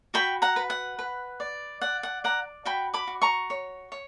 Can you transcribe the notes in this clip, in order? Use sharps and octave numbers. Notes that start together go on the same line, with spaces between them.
F#4 G5 B5
F#5 A#5
B4
F#5
B4
D5
D5 F#5
F#5
D5 F#5 A#5
F#4 G5 B5
B5 D6
F#4
A#5 C#6
C#5
C#5